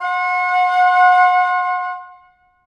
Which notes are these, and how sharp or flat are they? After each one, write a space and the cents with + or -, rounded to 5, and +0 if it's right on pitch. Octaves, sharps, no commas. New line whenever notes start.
F#5 -30 C6 +25